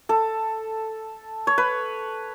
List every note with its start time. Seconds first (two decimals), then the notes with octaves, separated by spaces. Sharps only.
0.09 A4
1.47 C#5
1.58 B4